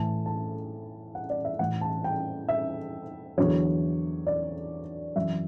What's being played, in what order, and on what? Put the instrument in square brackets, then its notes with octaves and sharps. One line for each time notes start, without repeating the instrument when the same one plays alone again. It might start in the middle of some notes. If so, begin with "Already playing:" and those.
Already playing: [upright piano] A2 E3 A5
A5
F#5
D5
E5
A2 E3 F#5
A5
G5
E5
E2 D3 F#3 C#5
D5
F#2 E3 E5